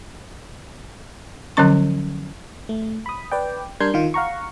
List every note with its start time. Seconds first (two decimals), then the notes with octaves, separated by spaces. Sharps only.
1.57 D3 F3 F#3 C#4 C#6
2.69 A3
3.06 B5 D#6
3.32 B4 D5 G5
3.80 G3 D4 A#4 C6 G6 G#6
3.94 D#3 F4
4.14 F5 F#5 A#5 C#6